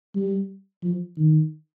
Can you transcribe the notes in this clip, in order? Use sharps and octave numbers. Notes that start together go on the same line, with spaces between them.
G3
F3
D#3